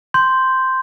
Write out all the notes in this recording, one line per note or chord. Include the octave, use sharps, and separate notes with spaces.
C6 G6